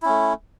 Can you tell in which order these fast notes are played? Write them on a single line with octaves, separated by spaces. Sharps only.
E4 C#4 A3